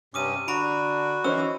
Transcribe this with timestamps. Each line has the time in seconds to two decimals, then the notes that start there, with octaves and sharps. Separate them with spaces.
0.14 G2 C3 C#4 D6 D#6 D#7
0.48 D3 D4 F#4 A#5 B5 D7
1.24 E3 C#4 D#4 C5 E6